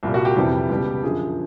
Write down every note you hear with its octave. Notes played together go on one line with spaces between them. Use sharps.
C2 A#2 G3
F#4
G4
F2 C3 E3 G3 G4
C#2 B2 G3
F#2 D3 F3 G#4